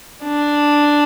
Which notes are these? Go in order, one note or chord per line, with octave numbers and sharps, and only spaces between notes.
D4